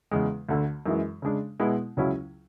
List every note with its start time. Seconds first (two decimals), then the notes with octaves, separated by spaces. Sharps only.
0.11 E2 C#3 G#3
0.49 D2 D3 A3
0.86 F#2 E3 G#3
1.22 C#3 G#3 D4
1.60 B2 G#3 B3 E4
1.97 C#2 C#3 F#3 C#4 E4